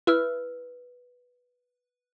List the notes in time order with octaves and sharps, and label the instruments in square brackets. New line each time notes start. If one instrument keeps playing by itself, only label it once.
[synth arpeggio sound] E4 [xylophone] B4 E6 F6